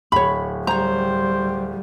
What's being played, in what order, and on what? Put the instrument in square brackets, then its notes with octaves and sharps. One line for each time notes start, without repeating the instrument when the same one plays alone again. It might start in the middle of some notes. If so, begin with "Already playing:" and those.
[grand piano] D1 [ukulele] C#5 B5
[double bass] G3 [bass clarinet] C5 [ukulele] C#5 A#5